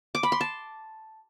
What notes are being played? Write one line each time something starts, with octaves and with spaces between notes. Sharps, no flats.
D6
B5
C6
A5